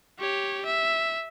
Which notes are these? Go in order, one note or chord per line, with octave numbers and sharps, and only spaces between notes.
G4 C#5
E5